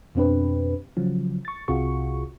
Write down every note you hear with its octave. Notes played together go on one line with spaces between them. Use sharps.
F2 B2 C4 D4 G4 B4
C#3 F3 F#3
C#6 A6
C2 C3 F4 F#4 G#4 C#6